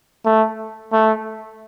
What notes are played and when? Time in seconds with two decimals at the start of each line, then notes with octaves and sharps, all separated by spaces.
0.25 A3
0.92 A3